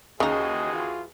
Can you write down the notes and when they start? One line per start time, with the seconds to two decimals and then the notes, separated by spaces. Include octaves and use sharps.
0.20 D#2 C#3 E3 D#4 F#4 G#4 D#5
0.74 F4